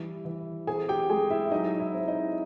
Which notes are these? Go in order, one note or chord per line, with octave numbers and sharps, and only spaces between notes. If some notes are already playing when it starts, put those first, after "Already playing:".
Already playing: E3 G3
E3
C4 G#4 G#5
G4 G5
G#3 G#4 G#5
E4 E5
F#3 D#4 D#5
E4 E5
C4
D#4 D#5